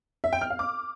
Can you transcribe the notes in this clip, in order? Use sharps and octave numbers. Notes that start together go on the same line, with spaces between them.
E5
G5
F6
F5
D6